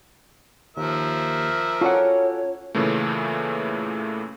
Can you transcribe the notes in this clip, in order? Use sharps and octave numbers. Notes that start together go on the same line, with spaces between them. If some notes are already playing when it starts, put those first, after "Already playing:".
D#2 F3 A#4 E5
C#4 F4 F#4 A4 C#5 D5 F#5
A#2 C#3 E3 A3